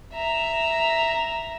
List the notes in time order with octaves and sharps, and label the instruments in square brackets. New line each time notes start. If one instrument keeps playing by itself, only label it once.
[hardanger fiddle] E5 A#5